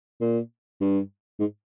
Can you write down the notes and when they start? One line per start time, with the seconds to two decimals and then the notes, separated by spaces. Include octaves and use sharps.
0.21 A#2
0.81 G2
1.40 G#2